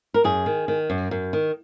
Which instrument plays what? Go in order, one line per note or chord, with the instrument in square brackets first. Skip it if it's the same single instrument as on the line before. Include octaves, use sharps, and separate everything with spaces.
[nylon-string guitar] A#4
F#2 G#4
D#3
D#3
F#2
F#2
D#3